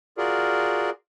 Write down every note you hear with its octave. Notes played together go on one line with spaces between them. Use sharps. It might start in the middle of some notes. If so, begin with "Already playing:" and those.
F4 F#4 G#4 A#4 D5